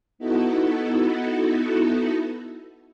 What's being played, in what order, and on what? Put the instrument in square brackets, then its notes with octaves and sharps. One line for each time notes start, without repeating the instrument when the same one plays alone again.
[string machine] B3 D#4 E4 F#4 A4